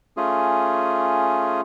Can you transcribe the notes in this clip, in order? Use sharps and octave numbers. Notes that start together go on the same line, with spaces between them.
A3 C#4 F4 G#4